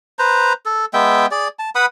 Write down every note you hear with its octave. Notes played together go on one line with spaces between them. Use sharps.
B4 C5 A#5
A4
G#3 B3 E5 G5
G#4 D5
A5
B4 F#5 B5 D#6